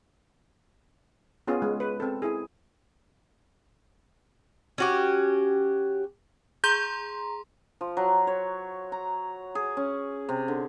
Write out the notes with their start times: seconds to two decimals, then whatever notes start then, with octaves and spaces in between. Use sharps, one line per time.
1.47 B3 C#4 F4 G#4
1.62 G#3
1.80 B4
2.00 C4 A4
2.22 E4 G#4
4.78 C#4 F#4 G4
6.64 G#4 A#5 C6 G6
7.81 F3
7.97 F#3
8.27 C#5
8.92 A#5
9.55 G#4
9.77 C#4
10.29 C3
10.48 D3